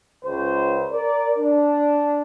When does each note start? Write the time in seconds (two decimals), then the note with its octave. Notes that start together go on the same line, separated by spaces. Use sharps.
0.24 C#2 C5
0.91 A#4 D5
1.38 D4